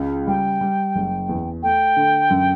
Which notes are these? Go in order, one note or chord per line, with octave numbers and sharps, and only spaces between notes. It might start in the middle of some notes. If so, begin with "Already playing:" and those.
Already playing: C#2 C#3
G3 G5
G3
F#1
E2
A3 G5
D3
F#2